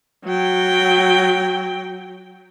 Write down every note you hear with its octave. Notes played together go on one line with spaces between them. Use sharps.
F#3 G5